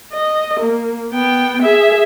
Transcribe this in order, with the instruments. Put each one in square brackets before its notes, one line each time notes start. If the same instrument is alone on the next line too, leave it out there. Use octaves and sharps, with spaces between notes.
[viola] D#5
A#3
B3 G5
G#4 E5